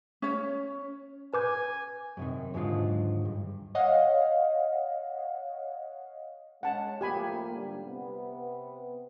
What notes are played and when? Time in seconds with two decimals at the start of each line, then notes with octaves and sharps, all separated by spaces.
0.22 C#4 C#5
1.34 B4 G#5 D6 G6
2.17 F#2 C3 D#3
2.54 D#2 G#2 D3 F#3 G#3 F4
3.25 G2
3.75 C#5 D#5 F5 F#5
6.63 G#3 C#4 F#5 A5
7.01 A2 F3 A#3 G4 G#5 B5
7.53 G#2 D3 G3
7.85 C3 B3